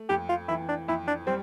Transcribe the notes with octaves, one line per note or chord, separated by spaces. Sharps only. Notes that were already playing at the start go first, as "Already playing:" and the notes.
Already playing: A3
F2 G4
F4
E3 E4
D4
F2 E4
D4
G3 C4